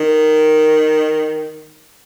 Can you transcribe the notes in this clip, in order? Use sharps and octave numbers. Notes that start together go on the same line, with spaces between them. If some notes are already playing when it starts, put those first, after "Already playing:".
Already playing: D#3